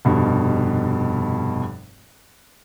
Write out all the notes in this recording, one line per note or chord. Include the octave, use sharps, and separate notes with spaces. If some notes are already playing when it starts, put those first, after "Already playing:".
F1 G2 B2